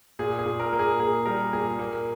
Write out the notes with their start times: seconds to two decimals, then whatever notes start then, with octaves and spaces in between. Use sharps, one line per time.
0.19 A#2 G#4
0.39 G#4
0.45 A#2
0.60 A#4
0.73 A#3
0.79 G#4
1.00 A#3 G#4
1.26 G3 A#4
1.53 A#2 G#4
1.79 A#3